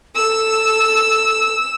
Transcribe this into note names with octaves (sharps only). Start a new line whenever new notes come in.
A4 E6